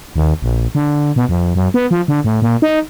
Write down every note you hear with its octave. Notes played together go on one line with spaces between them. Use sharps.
D#2
A#1
D3
B2
F2
F#2
B3
F3
D3
A2
A#2
D#4